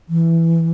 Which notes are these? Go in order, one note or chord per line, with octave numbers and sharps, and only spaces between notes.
E3